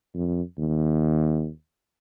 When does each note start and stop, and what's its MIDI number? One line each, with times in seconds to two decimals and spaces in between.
0.15 0.41 41
0.58 1.49 39